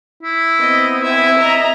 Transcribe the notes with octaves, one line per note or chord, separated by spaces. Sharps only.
E4
B3 C4 D#5
E4 E5 G#5
D#5 E5 A#5